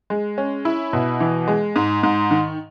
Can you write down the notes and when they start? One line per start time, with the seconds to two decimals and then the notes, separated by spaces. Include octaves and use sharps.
0.10 G#3
0.38 C#4
0.65 E4
0.93 B2
1.20 E3
1.47 G#3
1.76 G#2
2.03 G#2
2.31 D#3